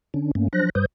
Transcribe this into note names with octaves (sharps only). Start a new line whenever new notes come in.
D3 C#4 D4
G2 A3 A#3 C#4
F3 F#3 D4 C5 F#6 A#6
G2 G3 B4 C5 D#6 G6